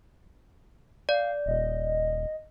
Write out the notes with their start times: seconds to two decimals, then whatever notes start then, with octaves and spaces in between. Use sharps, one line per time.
1.09 D5 F5
1.46 D#1 D#5